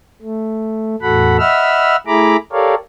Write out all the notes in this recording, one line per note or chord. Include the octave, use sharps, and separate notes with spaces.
A3
E2 A2 F#4 A4 F#5 B5
D#5 E5 F#5 B5 E6 F6
A3 E4 G#4 A#5 B5 D6
G4 A4 A#4 C#5 D5 F5